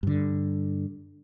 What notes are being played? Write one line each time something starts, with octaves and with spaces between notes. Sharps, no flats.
G2 D3